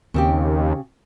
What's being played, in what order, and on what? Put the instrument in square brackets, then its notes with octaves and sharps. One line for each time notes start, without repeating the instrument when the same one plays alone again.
[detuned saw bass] D#2 [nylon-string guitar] C#3 C4 G4